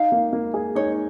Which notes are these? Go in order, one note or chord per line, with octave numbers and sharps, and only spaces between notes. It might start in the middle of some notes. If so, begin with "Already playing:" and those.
Already playing: D#4 F5
A#3
A#3
G#4
D#4 C#5